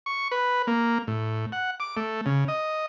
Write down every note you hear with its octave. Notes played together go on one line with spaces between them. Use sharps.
C#6
B4
A#3
A2
F#5
D6
A3
C#3
D#5